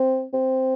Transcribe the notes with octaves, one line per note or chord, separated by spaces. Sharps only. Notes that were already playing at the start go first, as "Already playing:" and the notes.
Already playing: C4
C4